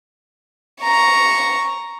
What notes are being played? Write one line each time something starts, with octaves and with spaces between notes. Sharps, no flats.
A#5 C#6